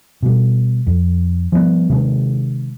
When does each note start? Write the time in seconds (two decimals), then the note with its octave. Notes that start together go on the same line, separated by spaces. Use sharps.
0.23 B2 G3
0.87 F2
1.52 F3 G3 A3 B3
1.90 C3 D#3 G#3